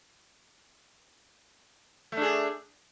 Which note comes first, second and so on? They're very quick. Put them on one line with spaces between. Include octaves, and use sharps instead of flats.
A3 D4 G#4